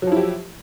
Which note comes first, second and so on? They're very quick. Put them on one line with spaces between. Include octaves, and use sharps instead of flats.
F#3 F3 E4 G4